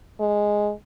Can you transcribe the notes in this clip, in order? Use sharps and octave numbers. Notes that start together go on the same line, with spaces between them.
G#3